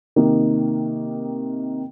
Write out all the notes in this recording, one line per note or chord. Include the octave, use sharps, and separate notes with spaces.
C3 D#3 A#3 D#4